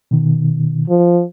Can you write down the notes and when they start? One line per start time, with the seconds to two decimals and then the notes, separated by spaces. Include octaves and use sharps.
0.11 B2 D#3
0.89 F3